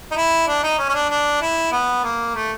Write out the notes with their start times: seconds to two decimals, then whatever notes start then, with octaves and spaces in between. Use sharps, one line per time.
0.11 D#4
0.16 E4
0.48 D4
0.63 D#4
0.79 C#4
0.89 C#4
0.94 D4
1.10 D4
1.42 E4
1.72 B3
2.04 A#3
2.35 A3